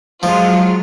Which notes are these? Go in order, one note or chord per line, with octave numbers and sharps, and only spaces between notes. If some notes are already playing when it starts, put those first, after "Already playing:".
F3 F#3 G#3 F4